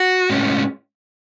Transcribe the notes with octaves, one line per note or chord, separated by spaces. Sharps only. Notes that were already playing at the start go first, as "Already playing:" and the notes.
Already playing: F#4
A2 G#3 C#4